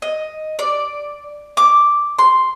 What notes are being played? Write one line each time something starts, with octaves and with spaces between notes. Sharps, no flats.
D#5
D5
D6
C6